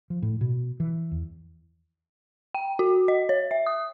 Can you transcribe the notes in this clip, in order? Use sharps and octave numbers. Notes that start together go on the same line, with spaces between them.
F3
A2
B2
E3
E2
G5
F#4
D#5
C#5
E5
D#6